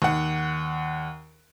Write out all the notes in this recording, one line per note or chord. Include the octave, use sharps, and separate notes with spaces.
D#2 F#5